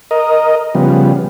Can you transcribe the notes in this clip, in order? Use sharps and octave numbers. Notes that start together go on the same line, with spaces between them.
A#4 D#5
C#3 F3 G3 B3